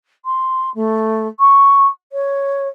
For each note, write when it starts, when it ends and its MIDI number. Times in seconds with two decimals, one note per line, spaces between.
0.25 0.70 84
0.75 1.27 57
1.39 1.87 85
2.12 2.68 73